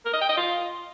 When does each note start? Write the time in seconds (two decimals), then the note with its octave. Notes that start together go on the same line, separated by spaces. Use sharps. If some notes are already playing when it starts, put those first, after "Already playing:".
0.05 A#4
0.13 D#5
0.21 G5
0.29 D#5
0.37 F4